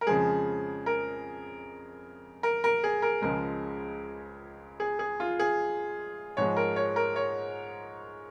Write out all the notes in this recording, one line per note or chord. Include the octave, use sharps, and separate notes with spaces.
A#4
F2 C#3 F3 G#3 G#4
A#4
A#4
A#4
G#4
A#4
C#2 C#3 F3 G#3 A#4
G#4
G#4
F4
G#4
G#2 F3 G#3 C#5
A#4
C#5
A#4
C#5